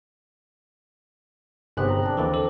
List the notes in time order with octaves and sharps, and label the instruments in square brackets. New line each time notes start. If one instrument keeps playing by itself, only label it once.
[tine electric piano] G1 C3 F#6 [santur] G#3 B3 C4
[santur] A#5
D4
[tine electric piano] D#2 D3 E3 [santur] A#4 D5
[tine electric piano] A4